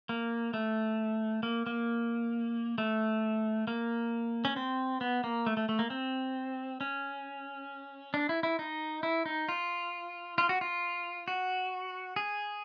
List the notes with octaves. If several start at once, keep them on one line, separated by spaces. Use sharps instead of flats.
A#3
A3
A#3
A#3
A3
A#3
C#4
C4
B3
A#3
A3
A3
A3
A#3
C4
C#4
D4
E4
E4
D#4
E4
D#4
F4
F4
F#4
F4
F#4
G#4